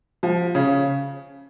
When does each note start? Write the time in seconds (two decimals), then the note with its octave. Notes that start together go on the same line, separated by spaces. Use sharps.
0.23 F3
0.55 C#3